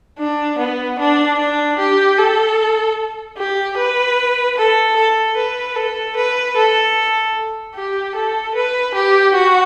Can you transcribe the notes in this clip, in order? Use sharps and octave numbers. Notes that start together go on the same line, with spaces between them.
D4
B3
D4
D4
G4
A4
G4
B4
A4
A4
B4
A4
B4
A4
G4
A4
B4
G4
F#4